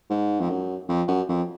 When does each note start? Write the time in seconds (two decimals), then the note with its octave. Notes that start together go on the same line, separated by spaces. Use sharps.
0.10 G#2
0.40 F2
0.49 F#2
0.89 F2
1.08 F#2
1.28 F2